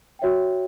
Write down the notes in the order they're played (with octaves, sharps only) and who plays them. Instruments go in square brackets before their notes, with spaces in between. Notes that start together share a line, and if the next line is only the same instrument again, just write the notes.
[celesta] F#4 C#5 E5 G5